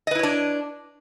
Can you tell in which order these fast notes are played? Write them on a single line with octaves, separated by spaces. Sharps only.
D#5 B4 E4 C#5 D4